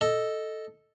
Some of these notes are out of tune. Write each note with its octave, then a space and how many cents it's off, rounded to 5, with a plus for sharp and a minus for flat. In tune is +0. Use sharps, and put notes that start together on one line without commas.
A4 +0 D#5 +0